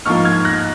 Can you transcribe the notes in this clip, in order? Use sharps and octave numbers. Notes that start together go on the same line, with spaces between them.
G#2 F3 A#3 F4 C#6 F6
F6 G#6
F#6 A#6